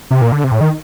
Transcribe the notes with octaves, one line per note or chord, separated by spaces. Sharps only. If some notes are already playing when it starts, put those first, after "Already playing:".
C3
A#2
D3
C3
A2
D#3